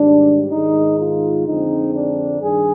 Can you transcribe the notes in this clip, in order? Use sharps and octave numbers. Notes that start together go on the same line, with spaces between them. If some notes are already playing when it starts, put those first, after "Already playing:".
Already playing: G#2 D#3 G3 D4
G#2 D#3 G#3 D#4
F4
F2 D3 G#3 C4 D#4
D4
G2 D#3 G#4